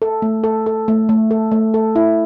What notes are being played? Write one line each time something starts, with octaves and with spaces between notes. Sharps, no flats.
A4
A3
A4
A4
A3
A3
A4
A3
A4
E4